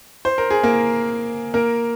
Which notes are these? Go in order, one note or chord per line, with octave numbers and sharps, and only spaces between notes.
C5
A#4
G#4
A#3 A#4
A#3 A#4